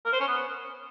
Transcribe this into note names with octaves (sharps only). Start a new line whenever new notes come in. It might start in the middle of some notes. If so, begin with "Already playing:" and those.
A#4
C5
C#4
B3